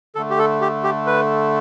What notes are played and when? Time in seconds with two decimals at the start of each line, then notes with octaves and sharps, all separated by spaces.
0.15 D3 A3 A4
0.30 G4
0.39 A4
0.61 G4
0.84 G4
1.07 B4